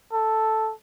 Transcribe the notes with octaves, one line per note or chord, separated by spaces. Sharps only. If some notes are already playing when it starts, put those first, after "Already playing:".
A4